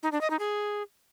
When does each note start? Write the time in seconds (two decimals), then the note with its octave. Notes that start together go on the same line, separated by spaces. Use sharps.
0.03 D#4
0.12 D4
0.21 D#5
0.30 D#4
0.39 G#4